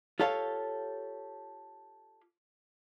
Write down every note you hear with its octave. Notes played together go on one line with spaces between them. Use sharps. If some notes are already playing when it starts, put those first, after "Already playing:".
F4 G4 A4 C#5 F5